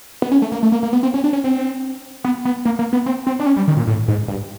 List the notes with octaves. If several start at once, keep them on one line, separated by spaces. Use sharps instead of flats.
B3
C#4
A3
A#3
A3
A#3
A#3
B3
C4
C#4
D4
C#4
C4
B3
B3
A#3
A#3
B3
C4
C4
D4
C#4
G3
D#3
A#2
A2
G#2
G2